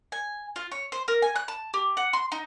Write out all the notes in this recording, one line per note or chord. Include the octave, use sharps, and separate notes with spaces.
G#5
F4
C#5
C5
A#4
G#5
F#6
A5
G4
F#5
C6
D#4